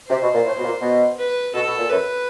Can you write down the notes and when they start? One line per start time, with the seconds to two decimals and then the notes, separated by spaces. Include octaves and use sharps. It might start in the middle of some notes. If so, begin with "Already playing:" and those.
0.08 C3 C5
0.21 B2
0.33 A#2
0.46 A2
0.58 B2
0.64 A#2
0.81 B2
1.18 B4
1.54 B2 A4
1.66 B2
1.78 A#2
1.90 F#2 B4